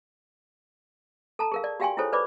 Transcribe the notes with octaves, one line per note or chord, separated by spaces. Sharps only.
A4 A5 A#5
G#4 A#4 F5
D5
F#4 G4 F5 G5 G#5 C6
E4 F4 G#4 A4 C5 C#5
B4 C5 D5 B5 D6